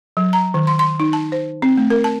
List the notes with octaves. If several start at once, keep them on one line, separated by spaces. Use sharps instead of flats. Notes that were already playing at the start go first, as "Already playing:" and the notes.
F#3
A#5
D#3
C6
C6
D#4
A5
C5
C4
A3
A#4
A5